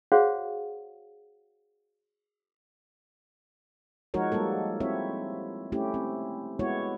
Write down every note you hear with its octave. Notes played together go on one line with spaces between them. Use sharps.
F#4 G#4 C5 C#5 F5 F#5
F3 G#3 D#4 F#4 A#4 C#5
G3 G#3 A#3 A4
C4 E4 C#5 E5
A3 C#4 E4 G4
C4
G#3 B3 E4 F#4 C#5